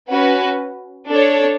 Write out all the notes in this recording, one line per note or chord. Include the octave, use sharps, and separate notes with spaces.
C#4 F#4 B4
D4 A4 C#5